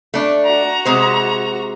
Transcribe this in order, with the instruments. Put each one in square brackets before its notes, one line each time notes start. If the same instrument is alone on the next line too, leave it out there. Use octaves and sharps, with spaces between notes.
[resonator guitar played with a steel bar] A3 D4
[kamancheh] F#4 A#5
[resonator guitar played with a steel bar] C3 G#3 C5